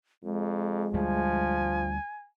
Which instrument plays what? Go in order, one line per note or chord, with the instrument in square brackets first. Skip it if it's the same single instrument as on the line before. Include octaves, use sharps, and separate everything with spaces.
[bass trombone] F2 [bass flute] G#3
[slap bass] D2 G3 [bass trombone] F3 [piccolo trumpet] G#5